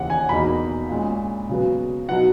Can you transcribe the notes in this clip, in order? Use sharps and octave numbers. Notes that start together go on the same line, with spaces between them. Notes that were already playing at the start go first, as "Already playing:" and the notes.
Already playing: D#2 C#3 E3 F#5
G#5
E2 B2 A#3 D#4 B5
A#2 G#3 C#4
C#3 F#3 B3
B2 F#3 B3 D#4 F#5